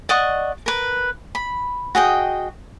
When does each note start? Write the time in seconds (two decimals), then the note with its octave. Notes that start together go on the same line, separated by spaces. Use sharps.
0.09 D5 D#5 F#5 C#6
0.66 A#4 B4
1.35 B5
1.95 F#4 G#4 D#5 G5